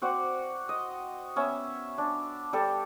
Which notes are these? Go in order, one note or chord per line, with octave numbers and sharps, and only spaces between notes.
C4 F#4 D5 F#5
D#5
B3 C#4 E5
D4
G3 A4 D5